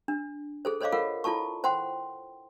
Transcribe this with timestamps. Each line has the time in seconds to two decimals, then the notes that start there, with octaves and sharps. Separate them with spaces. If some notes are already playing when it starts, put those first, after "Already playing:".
0.08 D4
0.65 G#4 A4 C5
0.81 A4 C5 C#5 D#5 F5 D6
0.92 F4 A4 A#4 F5 F#5
1.24 E4 F4 A4 A5 C#6
1.64 C5 F#5 G5 C6